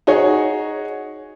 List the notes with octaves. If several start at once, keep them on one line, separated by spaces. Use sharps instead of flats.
D#4 F#4 G#4 C#5